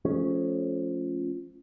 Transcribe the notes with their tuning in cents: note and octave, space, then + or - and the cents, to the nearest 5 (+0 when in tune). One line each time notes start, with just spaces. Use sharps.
F3 +0 A3 -20 C#4 -5